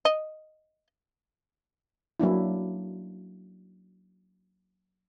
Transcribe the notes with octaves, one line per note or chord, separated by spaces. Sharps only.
D#5
F#3 A#3 D4 E4